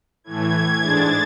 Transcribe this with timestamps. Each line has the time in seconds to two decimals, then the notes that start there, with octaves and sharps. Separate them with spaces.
0.24 A2 E3 A3 G#6
0.79 G#2 G#3 D4 A6